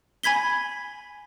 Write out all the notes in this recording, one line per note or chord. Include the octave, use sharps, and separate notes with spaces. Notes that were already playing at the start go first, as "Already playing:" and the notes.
G#5 B5 G#6 B6 G7